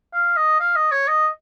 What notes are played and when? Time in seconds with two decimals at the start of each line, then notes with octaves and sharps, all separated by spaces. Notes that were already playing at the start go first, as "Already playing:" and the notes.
0.13 F5
0.37 D#5
0.60 F5
0.76 D#5
0.92 C#5
1.08 D#5